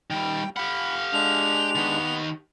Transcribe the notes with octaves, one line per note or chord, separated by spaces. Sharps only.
D#3 G3 G5
G4 F5 F#5 B5
G#3 D4 F7
D#3 B3 G4